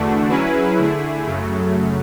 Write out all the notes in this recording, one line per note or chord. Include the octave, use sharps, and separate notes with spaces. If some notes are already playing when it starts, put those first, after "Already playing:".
Already playing: E2 D3 A3 D4 F#4
F#3 C#4 E4 G#4 B4
D3 A3 E4 G#4
F#2 C#3 F#3 A3